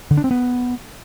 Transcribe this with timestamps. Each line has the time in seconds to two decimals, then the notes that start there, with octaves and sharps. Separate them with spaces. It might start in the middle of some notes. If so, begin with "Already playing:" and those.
0.11 D3
0.17 D4
0.24 C4
0.31 B3